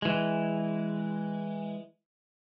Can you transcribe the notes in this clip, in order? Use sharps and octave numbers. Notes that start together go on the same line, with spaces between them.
E3 G#3